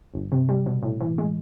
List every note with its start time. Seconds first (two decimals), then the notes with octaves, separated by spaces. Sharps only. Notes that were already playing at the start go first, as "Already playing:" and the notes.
0.14 G1
0.32 C3
0.49 G3
0.66 B2
0.83 A2
1.01 E3
1.18 G#3